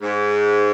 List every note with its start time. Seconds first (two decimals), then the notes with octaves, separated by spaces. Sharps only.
0.02 G#2